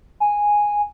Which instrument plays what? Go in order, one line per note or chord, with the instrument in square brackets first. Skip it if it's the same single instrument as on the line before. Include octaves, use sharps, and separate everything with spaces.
[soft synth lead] G#5